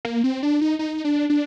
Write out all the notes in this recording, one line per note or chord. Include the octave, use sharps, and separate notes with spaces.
A#3
C4
D4
D#4
D#4
D4
D4